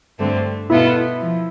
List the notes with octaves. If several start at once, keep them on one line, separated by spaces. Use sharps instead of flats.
G2 D3 A3 C4
B2 B3 E4 F4 A4
F3